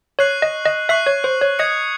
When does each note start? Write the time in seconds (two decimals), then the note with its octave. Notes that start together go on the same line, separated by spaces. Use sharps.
0.19 C#5 C#6 F#6 C7 F#7
0.42 D#5
0.65 D#5
0.89 E5 C#6 F#6 C7 F#7
1.06 C#5
1.24 C5
1.41 C#5
1.59 D#5 D#6 G#6 C#7